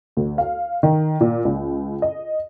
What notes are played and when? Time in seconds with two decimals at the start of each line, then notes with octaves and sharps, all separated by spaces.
0.17 D2
0.38 F5
0.83 D#3
1.21 A#2
1.45 C#2
2.02 D#5